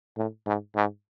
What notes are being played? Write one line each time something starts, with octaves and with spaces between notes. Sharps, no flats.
A2
G#2
G#2